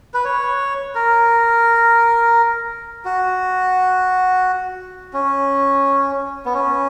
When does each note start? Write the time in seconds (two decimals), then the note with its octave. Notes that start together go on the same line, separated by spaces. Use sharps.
0.14 B4
0.25 C#5
0.95 A#4
3.05 F#4
5.14 C#4
6.46 B3
6.54 C#4